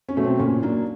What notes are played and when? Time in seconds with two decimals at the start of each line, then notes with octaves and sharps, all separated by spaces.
0.09 C#4
0.17 B2 F#3 A3
0.24 C4
0.39 A#2 C#4
0.63 F#3 A#3 D4